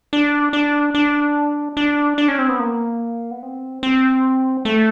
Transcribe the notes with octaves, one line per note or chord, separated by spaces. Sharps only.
D4
D4
D4
D4
D4
C#4
C4
B3
A#3
B3
C4
C4
A3